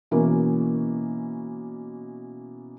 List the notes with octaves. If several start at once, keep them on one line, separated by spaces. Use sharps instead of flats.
B2 E3 A#3 C#4